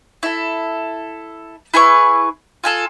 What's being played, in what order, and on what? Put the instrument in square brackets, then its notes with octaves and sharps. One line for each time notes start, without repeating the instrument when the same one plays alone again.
[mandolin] E4 A4
E4 G#4 B4 C#6
F4 G#4 A4